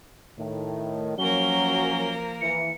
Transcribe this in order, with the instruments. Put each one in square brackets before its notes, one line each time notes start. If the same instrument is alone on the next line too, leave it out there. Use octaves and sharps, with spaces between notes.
[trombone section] A2 D#3
[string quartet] F3 A#3 A#4 [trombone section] F#3 C#4 [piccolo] G7
[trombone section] E3 [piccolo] C#7